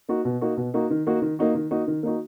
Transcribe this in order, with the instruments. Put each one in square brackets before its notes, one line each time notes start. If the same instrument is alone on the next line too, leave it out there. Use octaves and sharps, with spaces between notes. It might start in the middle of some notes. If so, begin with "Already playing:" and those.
[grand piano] A#3 D#4 F#4
B2
A#3 D#4 F#4
B2
A#3 D#4 F#4
D#3
A#3 D#4 F#4
D#3
A#3 D#4 F#4
D#3
A#3 D#4 F#4
D#3
A#3 D#4 F#4